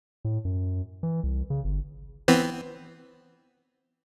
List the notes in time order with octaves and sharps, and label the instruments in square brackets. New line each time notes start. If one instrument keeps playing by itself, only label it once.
[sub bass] A2
F#2
E3
C2
C#3
G1
[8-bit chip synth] E3 B3 C4